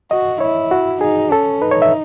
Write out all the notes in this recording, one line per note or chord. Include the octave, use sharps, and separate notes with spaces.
F#4 D#5
E4 C#5
F#4
D#4 G#4
C#4 A4
D#4 B4
C#5
E5